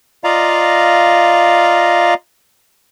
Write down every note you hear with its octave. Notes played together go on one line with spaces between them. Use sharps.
F4 D5 D#5 F5 A#5